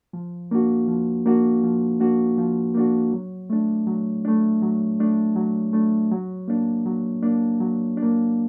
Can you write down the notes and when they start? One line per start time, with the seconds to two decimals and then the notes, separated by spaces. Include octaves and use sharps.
0.13 F3
0.51 A#3 D4 F#4
0.88 F3
1.25 A#3 D4 F#4
1.63 F3
2.00 A#3 D4 F#4
2.38 F3
2.74 A#3 D4 F#4
3.13 F#3
3.50 A3 D4
3.87 F#3
4.25 A3 D4
4.62 F#3
5.00 A3 D4
5.36 F#3
5.73 A3 D4
6.11 F#3
6.48 A#3 D4
6.86 F#3
7.22 A#3 D4
7.60 F#3
7.97 D4
8.02 A#3